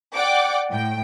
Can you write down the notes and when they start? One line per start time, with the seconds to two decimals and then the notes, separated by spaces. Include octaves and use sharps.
0.14 D5 F#5 G5 D6
0.70 A2 G5